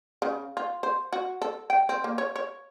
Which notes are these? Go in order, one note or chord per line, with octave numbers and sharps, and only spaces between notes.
C#3
F4
C5
F#4
A4
G5
C4
A#3
C#5
C#5